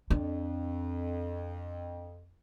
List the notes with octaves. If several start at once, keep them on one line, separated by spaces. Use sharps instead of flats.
F2 D4